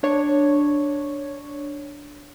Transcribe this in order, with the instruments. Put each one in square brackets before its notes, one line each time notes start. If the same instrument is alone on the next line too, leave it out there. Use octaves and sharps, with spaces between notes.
[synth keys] D4 C#5